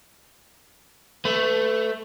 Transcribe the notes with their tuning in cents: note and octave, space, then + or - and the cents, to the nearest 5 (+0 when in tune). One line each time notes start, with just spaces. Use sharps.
A3 +0 B4 +30